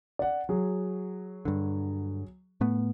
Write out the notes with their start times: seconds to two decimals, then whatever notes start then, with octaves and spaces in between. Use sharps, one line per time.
0.19 D5 F#5
0.49 F#3 G#4
1.45 G2 D3
2.61 A2 A3 B3